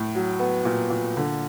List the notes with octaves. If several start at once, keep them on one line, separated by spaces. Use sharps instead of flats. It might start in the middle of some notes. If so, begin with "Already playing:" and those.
Already playing: A2
F#3
B3
A#2
A#2
D3